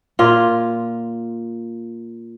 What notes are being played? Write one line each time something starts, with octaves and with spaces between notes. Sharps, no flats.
A#2 F4